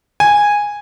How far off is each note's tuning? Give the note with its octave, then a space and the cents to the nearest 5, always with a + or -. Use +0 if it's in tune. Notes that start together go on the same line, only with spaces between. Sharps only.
G#5 -10